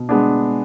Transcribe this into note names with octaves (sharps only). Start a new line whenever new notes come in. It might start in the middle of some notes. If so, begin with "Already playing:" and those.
Already playing: B2
G#3 B3 D4